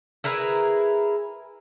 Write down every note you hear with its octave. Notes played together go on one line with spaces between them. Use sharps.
E4 G#4 A#4 B4